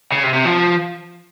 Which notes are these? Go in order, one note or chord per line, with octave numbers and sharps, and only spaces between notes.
C#3
C3
C3
F3